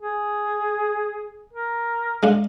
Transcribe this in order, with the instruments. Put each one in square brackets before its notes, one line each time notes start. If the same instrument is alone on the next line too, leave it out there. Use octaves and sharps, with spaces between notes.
[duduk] G#4
A#4
[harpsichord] G#3 D4 F5